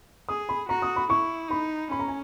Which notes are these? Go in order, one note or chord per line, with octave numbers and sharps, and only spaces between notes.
G#4 D#6
B5
F#4 A#5
D#6
B5
E4 C#6
D#4 B5
C#4 B5
A#5
G#5